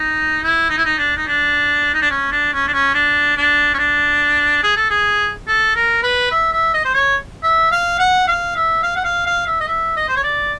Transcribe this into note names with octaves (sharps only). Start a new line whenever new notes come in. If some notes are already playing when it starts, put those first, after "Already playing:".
Already playing: D#4
E4
D#4
E4
D#4
D4
D#4
D4
D#4
D4
C#4
D4
C#4
D4
C#4
D4
D4
C#4
D4
G#4
A4
G#4
A4
A#4
B4
E5
E5
D#5
C5
C#5
E5
F5
F#5
F5
E5
F5
F#5
F5
F5
E5
D#5
E5
D#5
C5
C#5
D5